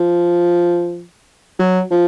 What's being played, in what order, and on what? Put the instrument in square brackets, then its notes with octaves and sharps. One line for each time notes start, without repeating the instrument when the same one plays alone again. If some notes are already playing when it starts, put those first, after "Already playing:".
Already playing: [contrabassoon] F3
F#3
F3